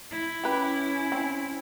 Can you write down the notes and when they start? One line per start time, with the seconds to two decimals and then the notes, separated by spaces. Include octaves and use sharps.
0.12 E4
0.44 C#4 G4 B4
1.12 C4